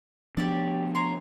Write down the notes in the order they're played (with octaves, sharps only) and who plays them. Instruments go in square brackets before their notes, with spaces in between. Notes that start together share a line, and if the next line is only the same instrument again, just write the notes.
[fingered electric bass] F3 B3 D4 [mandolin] G4 C#5 D5
[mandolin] C#5 A#5 C6